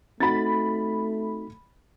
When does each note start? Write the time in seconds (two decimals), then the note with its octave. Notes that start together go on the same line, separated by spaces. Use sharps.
0.20 A3 C4 D#4 F#4 B5 A6